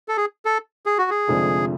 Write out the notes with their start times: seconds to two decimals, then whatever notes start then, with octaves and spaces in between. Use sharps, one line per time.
0.08 A4
0.17 G#4
0.45 A4
0.86 G#4
0.98 F#4
1.10 G#4
1.28 F1 F2 D3 F3 G#3